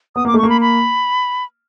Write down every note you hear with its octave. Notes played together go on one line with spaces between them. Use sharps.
B3 D#6
A#3 D6
A3
A#3 C#6
B5
B5